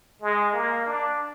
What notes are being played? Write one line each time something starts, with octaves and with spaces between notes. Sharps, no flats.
G#3
A#3
D4